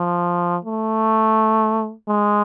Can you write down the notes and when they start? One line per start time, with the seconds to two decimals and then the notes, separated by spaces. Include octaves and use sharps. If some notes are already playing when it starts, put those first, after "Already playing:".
Already playing: F3
0.65 A3
2.08 G#3